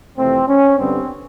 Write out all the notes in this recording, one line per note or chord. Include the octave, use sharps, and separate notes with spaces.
F2 C3 E3 A3 C4
C#4
G2 D3 G3 B3 C4